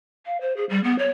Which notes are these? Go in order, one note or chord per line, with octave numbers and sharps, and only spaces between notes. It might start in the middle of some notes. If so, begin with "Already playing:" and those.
F5
C5
G#4
G3
B3
C#5